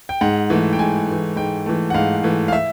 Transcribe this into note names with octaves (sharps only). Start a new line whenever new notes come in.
G5
G#2 F#5
E3 A3
G5
G#2 G#5
E3 A3
G#2 G5
E3 A3
F#5
G#2 F5
E3 A3
F5
E5